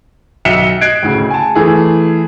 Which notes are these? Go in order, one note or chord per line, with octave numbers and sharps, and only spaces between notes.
B1 E5 B6 C#7 E7 G7
D#5 F#6 G#6 C7 D7
D2 A2 C#3
G#5 A5
E3 A3 G#4